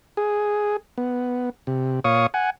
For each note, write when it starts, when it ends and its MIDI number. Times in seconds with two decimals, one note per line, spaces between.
0.17 0.77 68
0.98 1.50 59
1.67 2.00 48
2.04 2.27 46
2.04 2.27 73
2.04 2.27 77
2.04 2.27 85
2.04 2.27 87
2.34 2.50 78
2.34 2.50 80